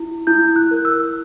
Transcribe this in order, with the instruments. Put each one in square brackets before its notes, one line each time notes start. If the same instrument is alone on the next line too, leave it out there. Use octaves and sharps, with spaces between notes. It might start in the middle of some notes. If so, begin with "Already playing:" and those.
Already playing: [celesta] E4
E4 G6
F#6
A#4
E6